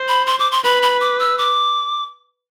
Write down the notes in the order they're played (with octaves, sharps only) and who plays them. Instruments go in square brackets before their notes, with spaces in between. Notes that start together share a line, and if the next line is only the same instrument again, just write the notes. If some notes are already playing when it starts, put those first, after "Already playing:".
Already playing: [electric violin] C5
[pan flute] B5
C6
D6
C6
[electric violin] B4 [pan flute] B5
[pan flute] B5
D6
E6
D6